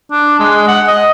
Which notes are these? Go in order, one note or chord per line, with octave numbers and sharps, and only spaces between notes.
D4
G#3
F#5
D#5